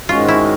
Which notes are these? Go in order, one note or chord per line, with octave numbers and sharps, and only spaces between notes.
G#2 D#3 G#3 C#4 F4 F#4
E4